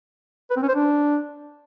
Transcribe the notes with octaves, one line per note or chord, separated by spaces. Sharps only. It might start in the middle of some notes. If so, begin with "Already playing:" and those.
B4
C4
C#4
C5
D4